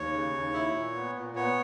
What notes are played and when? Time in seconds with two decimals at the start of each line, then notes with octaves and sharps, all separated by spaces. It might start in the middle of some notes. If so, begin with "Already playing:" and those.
Already playing: D#2 C#5
0.13 C#3
0.33 D#2
0.53 E4
0.74 A#2
0.95 B3
1.16 A#2
1.36 B3 C#5